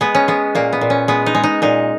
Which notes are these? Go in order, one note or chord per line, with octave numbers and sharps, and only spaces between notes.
G#3 B3
C#4
G#3 B3
A#2 A#3
B3
A#2
C#4
G#3 B3
D#4
G#3
D#4
A#2 D#4